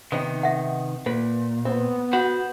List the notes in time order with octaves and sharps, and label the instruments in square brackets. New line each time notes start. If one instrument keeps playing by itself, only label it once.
[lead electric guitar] C3 D#3 [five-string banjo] B3 D#4
[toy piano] E5 F#5
[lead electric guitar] A#2 [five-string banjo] B4
[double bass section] B3 [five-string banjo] C4
[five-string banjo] F#4 [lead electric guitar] C5 B5 [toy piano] F#5